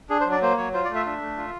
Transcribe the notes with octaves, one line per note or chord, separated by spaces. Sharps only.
D4 G#4
C5
F#3
D5
A#3 C5
F#3 C#5
F4 C5
D5
A3
E5
D4 E5
A3
F4